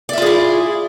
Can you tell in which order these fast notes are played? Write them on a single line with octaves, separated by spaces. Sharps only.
D5 E5 F4 G#4 E4